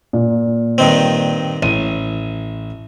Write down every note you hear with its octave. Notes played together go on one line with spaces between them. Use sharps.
A#2
G2 D#3 C4
A1 D#7